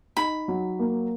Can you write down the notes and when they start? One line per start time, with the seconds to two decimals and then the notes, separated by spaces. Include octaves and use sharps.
0.17 D#4 B5
0.48 F#3
0.79 A#3